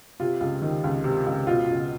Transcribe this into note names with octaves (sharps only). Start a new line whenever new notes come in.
C3 F4
C#2
D#3
C#2
C3
C#2
B2 F4
C#2